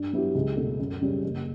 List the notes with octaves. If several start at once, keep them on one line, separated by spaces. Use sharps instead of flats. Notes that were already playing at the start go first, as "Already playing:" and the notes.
Already playing: G2
F#3 B3 E4 G4
C#2
B2 A3
F#2
C#3 G3 C#4
F#1